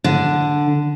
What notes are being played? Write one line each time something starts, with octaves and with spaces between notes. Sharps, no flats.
D3